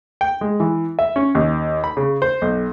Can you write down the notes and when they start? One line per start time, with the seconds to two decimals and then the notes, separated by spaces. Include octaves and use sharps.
0.21 G5
0.41 G#3
0.60 E3
0.99 E5
1.16 C#4
1.35 D#2
1.84 B5
1.97 C#3
2.22 C5
2.42 B1